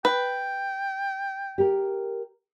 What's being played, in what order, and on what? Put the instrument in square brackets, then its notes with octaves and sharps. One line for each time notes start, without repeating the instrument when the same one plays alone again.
[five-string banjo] B4 [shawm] G5
[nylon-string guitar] G4 A#4